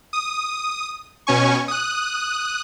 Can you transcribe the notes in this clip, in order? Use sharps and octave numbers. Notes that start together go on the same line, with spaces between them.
D#6
B2 C#4 G#5 C#6
D#6 F#6